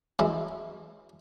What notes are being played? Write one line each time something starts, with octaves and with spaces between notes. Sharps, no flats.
F#2 E3 G#3 E4